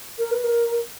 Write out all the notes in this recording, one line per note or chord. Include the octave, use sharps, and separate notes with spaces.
A#4
B4
A#4